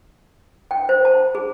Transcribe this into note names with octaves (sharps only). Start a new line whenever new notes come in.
G5
C5
A5
G#4